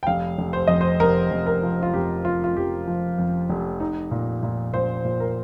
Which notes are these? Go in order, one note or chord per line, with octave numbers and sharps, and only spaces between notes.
G5
F1 F5
F1
C5
F2 D#5
C5
F1 A#4
F1
A#4
F3
F4
F2 G4
F1 F4
F4
F2 G4
F3
F2
F1
D#4
A#2
A#2
A#2 C5
A#2
A#4